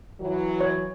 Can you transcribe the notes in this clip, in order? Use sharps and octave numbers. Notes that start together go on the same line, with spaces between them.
E3 F#3
C#5